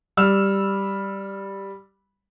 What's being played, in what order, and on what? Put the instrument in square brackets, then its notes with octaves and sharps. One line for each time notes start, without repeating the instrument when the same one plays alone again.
[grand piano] G3 E6 F6